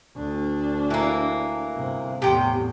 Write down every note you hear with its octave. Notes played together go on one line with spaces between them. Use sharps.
D2 D4
E3 A#3
G1 C3
E2 A2 C3 G5